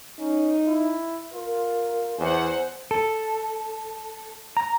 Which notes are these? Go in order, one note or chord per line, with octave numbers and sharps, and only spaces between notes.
C#4 D#4
E4
F4 A#4
E2 C5 F#5 G#5
A4
A#5